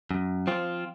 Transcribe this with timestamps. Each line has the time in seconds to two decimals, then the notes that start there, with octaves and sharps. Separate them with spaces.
0.11 F#2
0.47 F3 C4 F4